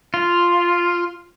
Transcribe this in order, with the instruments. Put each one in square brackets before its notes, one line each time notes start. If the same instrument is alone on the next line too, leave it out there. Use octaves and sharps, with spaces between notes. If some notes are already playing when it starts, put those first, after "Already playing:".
[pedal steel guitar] F4